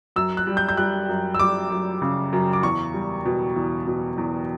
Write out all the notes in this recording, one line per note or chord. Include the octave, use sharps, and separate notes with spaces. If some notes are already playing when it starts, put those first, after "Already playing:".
F#2 E6
F#6
G3
G6
G6
G3 F#6
F#2
E6
G3 D6
F#2
C#3
F#2
D6
E2 C#6
G3
B2
E2
B2
E2